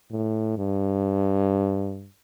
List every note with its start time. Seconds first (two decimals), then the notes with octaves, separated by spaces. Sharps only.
0.11 A2
0.58 G2